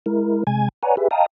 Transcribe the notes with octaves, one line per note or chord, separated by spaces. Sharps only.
G#3 E4 A#4
C3 G#3 G#5 G#6
B4 C#5 D5 F#5 G#5 A#5
G4 G#4 B4 E5
D#5 F5 G5 A5 A#5 D#6